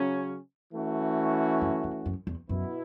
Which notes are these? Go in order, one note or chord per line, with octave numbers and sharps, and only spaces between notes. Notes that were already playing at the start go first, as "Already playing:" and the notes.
Already playing: C#3 F#3 C#4
E3 A3 C#4 F#4
F#2
E2
F#2
E2
F#2 B2 B3 E4